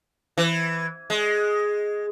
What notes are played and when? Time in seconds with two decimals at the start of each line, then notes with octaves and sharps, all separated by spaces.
0.38 E3
1.10 G#3